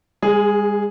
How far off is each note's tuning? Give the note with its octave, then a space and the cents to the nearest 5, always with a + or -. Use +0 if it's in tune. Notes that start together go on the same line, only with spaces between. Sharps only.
G#3 -45 G#4 +0